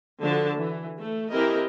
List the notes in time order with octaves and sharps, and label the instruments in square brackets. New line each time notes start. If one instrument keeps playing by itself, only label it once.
[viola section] D3 F3 F#4 A5
E3
A3
E3 C4 E4 G4 A#4 D#5